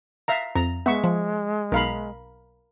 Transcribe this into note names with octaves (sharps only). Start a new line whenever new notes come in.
E5 F5 A#5
F2 A#5
G#3 B3 E5 C#6
F3
B1 A#4 F5 B5